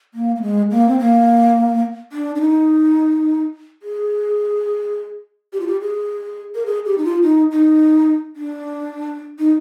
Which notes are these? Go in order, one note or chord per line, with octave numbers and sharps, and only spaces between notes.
A#3
A#3
G#3
A#3
C4
A#3
D4
D4
D#4
G#4
G4
F4
G4
G#4
A#4
G#4
G4
D#4
F4
D#4
D#4
D4
D#4